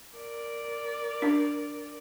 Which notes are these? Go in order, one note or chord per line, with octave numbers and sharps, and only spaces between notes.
A#4 D5
D4